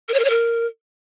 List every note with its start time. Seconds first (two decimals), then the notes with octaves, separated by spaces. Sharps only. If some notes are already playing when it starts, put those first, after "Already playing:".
0.09 A#4
0.14 C#5
0.19 A#4
0.25 C#5
0.30 A#4